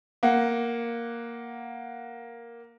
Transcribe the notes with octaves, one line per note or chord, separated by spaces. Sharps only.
A#3 F#5